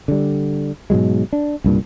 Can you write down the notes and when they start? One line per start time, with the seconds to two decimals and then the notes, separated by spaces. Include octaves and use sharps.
0.08 D3 G3
0.90 G#2 B2 F#3 G#3
1.33 D4
1.64 C2 G2 A#2